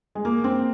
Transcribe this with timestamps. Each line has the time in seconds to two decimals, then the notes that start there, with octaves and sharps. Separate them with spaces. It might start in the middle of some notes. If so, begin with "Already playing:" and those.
0.15 G#3
0.25 A#3
0.44 C4